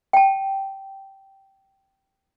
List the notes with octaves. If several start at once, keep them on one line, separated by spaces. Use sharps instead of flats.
G5 A5